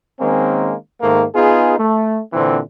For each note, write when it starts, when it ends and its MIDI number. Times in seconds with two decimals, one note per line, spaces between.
0.20 0.74 51
0.20 0.74 56
0.20 0.74 58
0.20 0.74 60
0.20 0.74 61
1.01 1.24 44
1.01 1.24 51
1.01 1.24 57
1.01 1.24 58
1.35 1.75 59
1.35 1.75 63
1.35 1.75 65
1.35 1.75 68
1.78 2.19 57
2.33 2.60 46
2.33 2.60 50
2.33 2.60 52
2.33 2.60 60